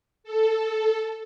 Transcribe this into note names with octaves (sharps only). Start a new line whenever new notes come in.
A4